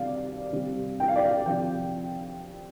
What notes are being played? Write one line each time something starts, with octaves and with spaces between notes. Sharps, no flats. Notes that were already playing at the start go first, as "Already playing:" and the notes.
Already playing: C3 G3 D5 F5
C3 G3
G5
F5
D5
F5
C3 F3 G5